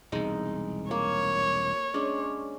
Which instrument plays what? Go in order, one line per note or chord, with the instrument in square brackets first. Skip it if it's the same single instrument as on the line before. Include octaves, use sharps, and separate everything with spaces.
[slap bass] E1 C2 [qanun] G#3 D#4
[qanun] A#3 [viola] C#5
[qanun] G#3 C#4 D4